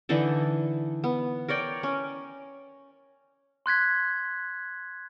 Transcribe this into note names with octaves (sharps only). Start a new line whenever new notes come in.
D3 E3 D#4 A4
B3
A#4 C#5 D5 G5
C#4
C6 F#6 G#6 B6